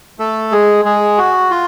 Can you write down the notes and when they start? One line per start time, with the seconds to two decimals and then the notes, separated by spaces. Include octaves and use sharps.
0.19 A3 A4
0.52 G#3 G#4
0.85 G#3 G#4
1.18 F#4
1.51 F4